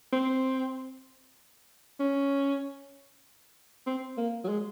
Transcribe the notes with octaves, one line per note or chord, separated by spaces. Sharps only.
C4
C#4
C4
A#3
F#3
G#3